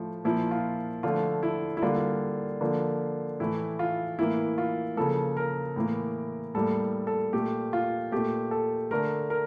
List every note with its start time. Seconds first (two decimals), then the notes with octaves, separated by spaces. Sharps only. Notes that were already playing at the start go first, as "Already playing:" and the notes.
Already playing: A2 F3 A3
0.24 A#2 F3 A#3 E4
0.51 F4
1.03 D3 F3 A3 F4
1.43 E4
1.77 E4
1.82 D3 G3 A#3 F4
2.61 D3 F3 A#3
3.40 A2 E3 A3 E4
3.79 F4
4.19 A2 E3 A#3 E4
4.58 F4
4.97 C#3 F3 A#3 A4
5.37 A#4
5.76 A2 E3 A#3
6.55 A2 G3 A#3 A4
7.07 A4
7.33 A#2 A3 G4
7.73 F4
8.12 A#2 A3 G4
8.51 A4
8.91 D3 A3 A#4
9.30 A#4